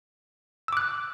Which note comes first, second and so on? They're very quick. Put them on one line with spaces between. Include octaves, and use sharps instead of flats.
E6 D6 F#6